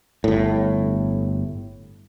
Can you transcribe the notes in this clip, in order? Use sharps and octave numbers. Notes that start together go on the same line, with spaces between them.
G1 A2